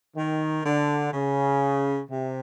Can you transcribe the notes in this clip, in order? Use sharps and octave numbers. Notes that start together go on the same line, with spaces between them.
D#3
D3
C#3
C3